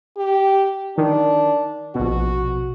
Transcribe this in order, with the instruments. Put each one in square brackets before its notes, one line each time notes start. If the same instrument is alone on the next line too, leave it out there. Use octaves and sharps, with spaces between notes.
[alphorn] G4
[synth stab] D#3 [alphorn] D4
[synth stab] A#1 B2 [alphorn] F#4